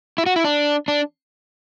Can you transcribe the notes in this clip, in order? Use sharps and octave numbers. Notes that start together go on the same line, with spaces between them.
E4
F#4
E4
D4
D4